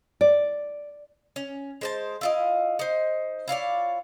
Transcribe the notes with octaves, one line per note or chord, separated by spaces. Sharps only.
D5
C#4
G#3 C5 A5
E4 F4 D#5
D#4 C5
E4 F4 C#5 D5